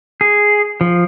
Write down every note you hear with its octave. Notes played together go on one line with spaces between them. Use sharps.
G#4
F3